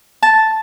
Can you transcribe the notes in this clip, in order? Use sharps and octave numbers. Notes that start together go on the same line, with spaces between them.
A5